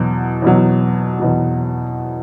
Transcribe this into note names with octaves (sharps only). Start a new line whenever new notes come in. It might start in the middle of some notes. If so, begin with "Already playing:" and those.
Already playing: E2 B2 F#3
E2 B2 F#3
E2 B2 F#3